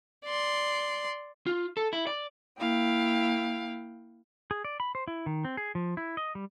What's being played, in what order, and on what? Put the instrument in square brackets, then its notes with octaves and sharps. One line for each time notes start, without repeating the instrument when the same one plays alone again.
[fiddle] D5 C6
[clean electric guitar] F4
A4
E4
D5
[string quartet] A#3 E4 F5 G5
[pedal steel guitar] G#4
D5
B5
C5
E4
D#3
C4
G#4
F3
E4
D#5
G3